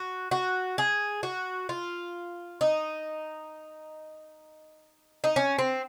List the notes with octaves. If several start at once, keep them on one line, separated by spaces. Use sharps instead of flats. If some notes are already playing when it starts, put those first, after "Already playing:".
Already playing: F#4
F#4
G#4
F#4
F4
D#4
D#4
C#4
C4